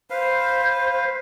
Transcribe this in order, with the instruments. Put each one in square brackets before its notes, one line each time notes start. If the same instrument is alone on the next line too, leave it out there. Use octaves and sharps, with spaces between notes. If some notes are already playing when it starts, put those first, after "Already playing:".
[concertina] B4 F5 [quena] C5